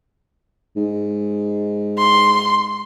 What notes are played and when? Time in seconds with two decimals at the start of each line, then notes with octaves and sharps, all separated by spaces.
0.76 G#2
1.98 C6